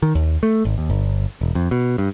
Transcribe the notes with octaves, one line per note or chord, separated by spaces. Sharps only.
D#3
D#2
A3
G#1
D#2
G1
E1
F2
B2
G2